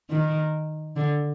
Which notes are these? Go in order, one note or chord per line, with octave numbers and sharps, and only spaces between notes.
D#3
D3